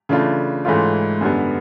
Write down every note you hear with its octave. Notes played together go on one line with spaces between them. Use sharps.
C#3 E3 A3 D4 F4
G#2 E3 A3 C#4 F4
F#2 D3 G3 B3